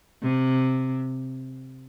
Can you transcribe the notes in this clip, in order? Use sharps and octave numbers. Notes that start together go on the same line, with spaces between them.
C3